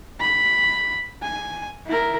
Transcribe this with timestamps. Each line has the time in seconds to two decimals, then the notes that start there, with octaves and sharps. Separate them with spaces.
0.20 B5
1.23 G#5
1.87 E4 A#4